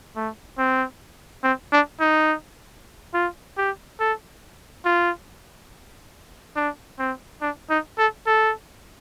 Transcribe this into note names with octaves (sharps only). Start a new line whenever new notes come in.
A3
C4
C4
D4
D#4
F4
G4
A4
F4
D4
C4
D4
D#4
A4
A4